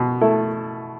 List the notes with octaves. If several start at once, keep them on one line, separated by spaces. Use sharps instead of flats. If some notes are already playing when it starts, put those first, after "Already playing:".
Already playing: B2
A3 E4 A4